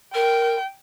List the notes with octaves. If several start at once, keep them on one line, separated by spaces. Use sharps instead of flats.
A#4 G5